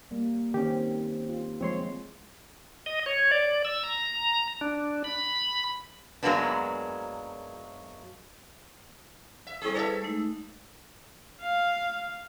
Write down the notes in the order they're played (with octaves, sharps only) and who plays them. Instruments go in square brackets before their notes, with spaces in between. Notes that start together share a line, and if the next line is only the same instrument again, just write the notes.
[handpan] G3 A#3
[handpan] D#3 C4 [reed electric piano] C#4 G4
[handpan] F4
[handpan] F3 G#3 [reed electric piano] C4 C#5 C6
[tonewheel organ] D#5
C#5
D5
E6
A#5
D4
B5
[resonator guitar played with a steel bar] F#2 F#3 G#3 A#3 B3 D4
[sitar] E5
[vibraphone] G3 E4 A4 [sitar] C4 G#4
[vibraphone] G#4 B4 [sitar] A4 C#5 E5
[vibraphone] G#3 A3 D#4
[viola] F5